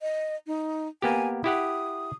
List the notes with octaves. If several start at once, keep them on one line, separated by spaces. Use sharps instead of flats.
D#5
D#4
A#3 B3 G4 G#5
E4 G4 F#5 D#6